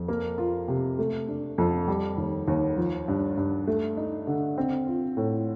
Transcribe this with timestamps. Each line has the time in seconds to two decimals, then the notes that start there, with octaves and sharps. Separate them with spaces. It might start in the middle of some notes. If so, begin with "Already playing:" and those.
Already playing: F2
0.08 A#3
0.38 F4
0.68 C3
0.99 A3
1.28 D4
1.58 F2
1.88 G3
2.18 D#2
2.48 D#2
2.77 F3
3.08 G2
3.37 G2
3.67 A3
3.97 D#4
4.27 D3
4.58 C4
4.87 F4
5.17 A2